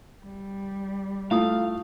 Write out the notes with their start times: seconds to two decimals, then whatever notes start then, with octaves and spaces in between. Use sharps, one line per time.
0.24 G3
1.31 A3 E4 F4 F5 D#6